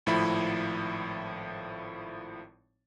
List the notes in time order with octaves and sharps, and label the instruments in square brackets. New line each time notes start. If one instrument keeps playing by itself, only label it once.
[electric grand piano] G#1 A2 F3 E4 B5